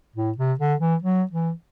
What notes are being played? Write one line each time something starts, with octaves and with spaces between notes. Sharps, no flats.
A2
C3
D3
E3
F#3
E3